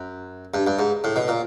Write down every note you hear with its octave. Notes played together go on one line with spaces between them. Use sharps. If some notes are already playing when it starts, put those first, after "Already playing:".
Already playing: F#2
G2
G2
G#2
A2
B2
A#2